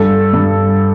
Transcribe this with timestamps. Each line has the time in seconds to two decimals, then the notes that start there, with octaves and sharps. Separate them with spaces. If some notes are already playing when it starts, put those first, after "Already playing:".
Already playing: G2 A4
0.34 G2